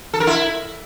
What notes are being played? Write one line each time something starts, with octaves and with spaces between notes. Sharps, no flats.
A4
A#4
E4